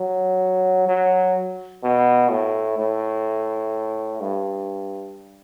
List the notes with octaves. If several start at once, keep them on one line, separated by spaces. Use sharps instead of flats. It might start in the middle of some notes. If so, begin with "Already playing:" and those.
Already playing: F#3
F#3
B2
A2
A2
G2